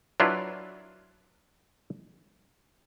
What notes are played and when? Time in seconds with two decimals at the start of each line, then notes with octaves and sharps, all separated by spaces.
0.20 F#3 D4 E4 F4 B4